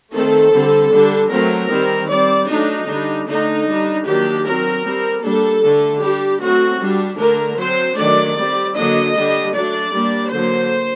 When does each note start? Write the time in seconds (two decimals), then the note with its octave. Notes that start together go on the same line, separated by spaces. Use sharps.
0.13 D#3 A3 C4 A4
0.52 D3 G3 C4
0.91 D3 G3 D4
1.30 F#3 A3 C4 A#4
1.69 D#3 G3 C4
2.08 G3 C4 D5
2.48 F#3 A3 D4 D#4
2.87 D3 G3 D4
3.26 D3 A3 D4 D#4
3.66 G3 D4
4.04 D#3 F#3 A#3 D4 G4
4.44 F#3 C4 A#4
4.84 G3 C4
5.22 G3 A#3 D4 A4
5.62 D3 A3 D4
6.01 G3 D4 G4
6.40 F#3 A3 C4 F#4
6.80 G3 D4
7.18 D3 A3 D4 A#4
7.58 F#3 C4 C5
7.96 D#3 F#3 A3 D4 D5
8.37 G3 C4
8.75 D3 F#3 A#3 D4 D#5
9.15 D3 G3 D4
9.54 F#3 A3 D4 D5
9.93 G3 A#3 D4
10.32 D3 F#3 A#3 C5